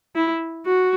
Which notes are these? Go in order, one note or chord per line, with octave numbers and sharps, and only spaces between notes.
E4
F#4